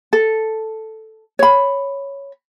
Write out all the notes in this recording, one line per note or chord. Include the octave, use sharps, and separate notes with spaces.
A4
C#5 B5